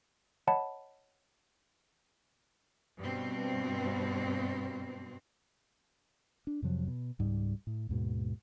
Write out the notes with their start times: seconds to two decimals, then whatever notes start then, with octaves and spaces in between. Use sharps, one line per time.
0.47 C#5 D#5 F#5 A5 B5
3.00 G2 B2 C4
6.47 D4
6.62 F2 C3 F3 F#3
6.88 B2
7.19 C#2 G#2 G3
7.67 A2
7.89 D#2 G#2 B2